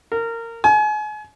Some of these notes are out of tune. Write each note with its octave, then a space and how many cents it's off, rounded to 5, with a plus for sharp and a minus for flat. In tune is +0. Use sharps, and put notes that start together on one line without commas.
A#4 -20
G#5 +35